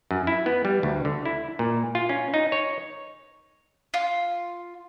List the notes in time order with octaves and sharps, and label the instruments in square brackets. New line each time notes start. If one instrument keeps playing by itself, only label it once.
[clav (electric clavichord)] F#2
E4
B3
G3
D2
D3
E4
A#2
F4
C#4
D#4
C#5
[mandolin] F4